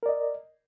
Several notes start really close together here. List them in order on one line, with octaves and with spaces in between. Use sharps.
A#4 D5 D#5